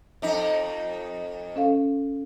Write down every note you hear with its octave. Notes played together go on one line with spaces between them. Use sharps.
F2 D#4
C#4 A4 F5